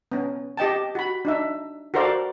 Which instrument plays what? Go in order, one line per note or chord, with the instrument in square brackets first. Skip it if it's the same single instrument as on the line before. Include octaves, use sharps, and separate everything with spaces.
[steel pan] B3 C#4
G4 D#5 G5 A5
F#4 B5
D4 D#4 E5
F#4 A4 A#4 C5 D5 F5